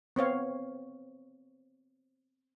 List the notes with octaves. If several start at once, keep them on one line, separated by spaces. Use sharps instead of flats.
B3 C4 C#5 F5